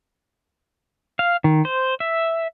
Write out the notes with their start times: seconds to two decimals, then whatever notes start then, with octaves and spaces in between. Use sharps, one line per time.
1.19 F5
1.44 D#3
1.65 C5
2.00 E5